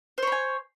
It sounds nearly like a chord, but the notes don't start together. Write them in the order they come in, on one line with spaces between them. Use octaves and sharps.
C5 C#5 B5 G#5